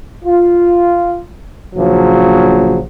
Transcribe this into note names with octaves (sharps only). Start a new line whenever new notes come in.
F4
A#1 C#3 F3 F#3